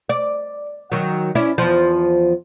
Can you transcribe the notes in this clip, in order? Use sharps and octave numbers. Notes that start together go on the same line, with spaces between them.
D5
D#3 F#3
C#4 D4 E4
E2 F3